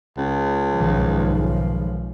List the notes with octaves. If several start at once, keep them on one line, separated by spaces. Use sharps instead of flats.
C#2
B1 G#2 D#3 F3